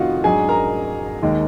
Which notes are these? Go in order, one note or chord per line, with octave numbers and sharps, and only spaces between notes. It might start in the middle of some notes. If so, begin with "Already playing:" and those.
Already playing: F1 F2 D#3 F4 F#4 D#5 F5 F#5
G#2 F#3 D4 G#4 G#5
A#4 A#5
D#2 D#3 G#3